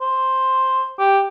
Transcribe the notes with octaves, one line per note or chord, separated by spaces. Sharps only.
C5
G4